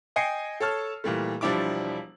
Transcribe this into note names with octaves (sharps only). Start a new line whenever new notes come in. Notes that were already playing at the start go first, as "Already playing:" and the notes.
D#5 G5 G#5 C7 C#7
A4 C#5 A5 F6
A#2 E3 G3 A3
E1 F3 G3 D4 E4 D6